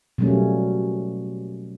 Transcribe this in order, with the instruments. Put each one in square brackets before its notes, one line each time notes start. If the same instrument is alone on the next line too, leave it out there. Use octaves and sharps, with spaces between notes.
[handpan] B2 F#3 G3 A3 A#3 C#4